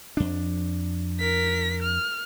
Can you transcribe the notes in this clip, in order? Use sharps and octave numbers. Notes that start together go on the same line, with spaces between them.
F2 D4
A#4 B6
F6